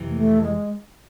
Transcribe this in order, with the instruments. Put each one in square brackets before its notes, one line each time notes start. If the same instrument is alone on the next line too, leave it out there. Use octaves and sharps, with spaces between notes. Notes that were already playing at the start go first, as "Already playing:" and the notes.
Already playing: [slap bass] F2 C3 E3
[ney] A#3
A3
G#3